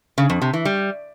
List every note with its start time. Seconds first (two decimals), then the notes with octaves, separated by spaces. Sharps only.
0.18 C#3
0.30 F2
0.42 C3
0.54 E3
0.65 G3